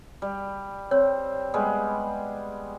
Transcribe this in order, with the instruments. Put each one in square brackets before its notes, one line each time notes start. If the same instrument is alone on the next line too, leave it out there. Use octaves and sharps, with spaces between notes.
[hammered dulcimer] G3
[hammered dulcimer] C4 [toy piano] C#5
[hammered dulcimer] G3 G#3 B3